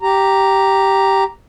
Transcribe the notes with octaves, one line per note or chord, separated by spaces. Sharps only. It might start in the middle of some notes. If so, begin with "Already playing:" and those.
G4 A#5